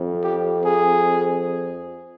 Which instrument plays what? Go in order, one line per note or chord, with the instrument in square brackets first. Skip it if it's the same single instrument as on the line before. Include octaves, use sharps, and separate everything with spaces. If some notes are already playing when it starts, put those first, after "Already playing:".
Already playing: [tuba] F2
[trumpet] G4
G#4